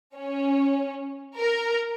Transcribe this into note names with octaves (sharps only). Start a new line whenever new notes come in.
C#4
A#4